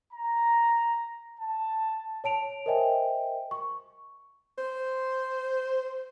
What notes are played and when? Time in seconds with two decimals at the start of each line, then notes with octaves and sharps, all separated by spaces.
0.13 A#5
1.39 A5
2.24 C#5 A5 D7 F7
2.66 A#4 C5 D#5 E5 G5 G#5
3.51 C#6
4.58 C5